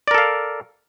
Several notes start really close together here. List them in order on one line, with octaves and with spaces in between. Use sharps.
D5 A#4 A4 F5